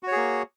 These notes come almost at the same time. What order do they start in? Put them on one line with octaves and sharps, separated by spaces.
F#4 C#5 G#4 A#3